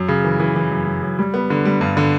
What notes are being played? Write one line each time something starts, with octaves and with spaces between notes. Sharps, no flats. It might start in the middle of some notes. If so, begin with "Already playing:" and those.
Already playing: F#2
C#3
E3
E3
E3
F#2
F#2
F#2
G3
B3
D3
G3
G2
D3